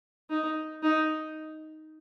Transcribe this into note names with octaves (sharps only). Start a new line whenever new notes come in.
D#4
D#4